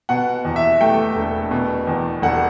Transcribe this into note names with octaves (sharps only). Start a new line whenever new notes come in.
B2 F#5
E2
E5
A3 G5
E1
B2
E2
E1 F#5